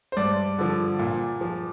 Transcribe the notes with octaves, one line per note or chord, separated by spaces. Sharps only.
C5
G2 D5
D3 F3
A#2
F3